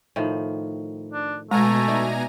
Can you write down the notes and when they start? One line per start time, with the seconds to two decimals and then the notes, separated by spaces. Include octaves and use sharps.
0.16 A2 D#3 F3
1.13 D4
1.51 B2 G#3 A3 G#5 A#5
1.88 D#4 E4 D5